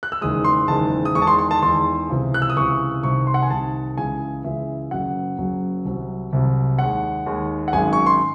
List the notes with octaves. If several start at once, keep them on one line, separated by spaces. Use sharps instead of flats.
F#6
E6
F#1 E2 D#3 G#3 D#6
C6
F#1 E2 D#3 G#3 A5
D#6
E2 D#3 G#3 C#6
A5
C6
C6
A5
E2 D#3 G#3 C6
C#2 C3 E3
F#6
E6
D#6
C#2 C3 E3 C#6
C2 C3 D#3 C#6
C6
F#5
G#5
C2 C3 D#3 A5
C#2 C#3 E3 G#3 G#5
C#2 C#3 E3 G#3 E5
F#1 F#2 C#3 F#3 F#5
F#1 F#2 C#3 F#3
C2 C3 F#3
C2 C3 F#3
D#2 D#3 G#3 F#5
D#2 D#3 G#3
F#5
G#1 F#2 D#3 G#3 G#5
C#6
C6